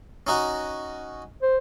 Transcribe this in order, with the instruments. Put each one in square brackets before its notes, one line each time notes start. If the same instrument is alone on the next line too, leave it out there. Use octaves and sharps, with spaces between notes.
[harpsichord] C#4 D#4 F#4
[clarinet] C5